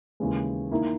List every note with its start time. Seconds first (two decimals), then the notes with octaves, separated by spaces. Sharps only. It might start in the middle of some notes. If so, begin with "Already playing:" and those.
0.20 D#2 C#3 E3 G#3
0.71 D#3 A#3 E4